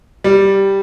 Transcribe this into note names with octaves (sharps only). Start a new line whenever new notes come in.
G3